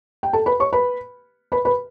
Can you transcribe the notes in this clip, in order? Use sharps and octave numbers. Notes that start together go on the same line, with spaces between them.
G5
A4 A5
B4 B5
C#5 C#6
B4 B5
B4 B5
B4 B5